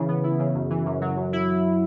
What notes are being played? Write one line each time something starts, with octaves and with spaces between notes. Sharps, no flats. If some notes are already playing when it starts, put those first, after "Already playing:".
Already playing: C#3 E3
B3
E4
C#3
F#2
E3
F#2
F#3
F#2
E4